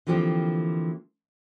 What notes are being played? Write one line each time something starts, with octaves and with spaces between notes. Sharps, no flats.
D3 E3 F3 A#3 C4 G4